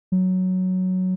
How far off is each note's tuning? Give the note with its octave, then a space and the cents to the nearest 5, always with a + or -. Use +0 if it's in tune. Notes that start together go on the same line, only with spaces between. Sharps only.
F#3 +0